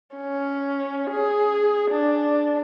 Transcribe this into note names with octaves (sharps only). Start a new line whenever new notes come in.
C#4
G#4
D4